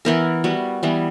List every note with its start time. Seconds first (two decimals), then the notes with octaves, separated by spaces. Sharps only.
0.05 E3 B3 E4 A#4
0.44 G3 B3 F#4
0.83 E3 G3 B3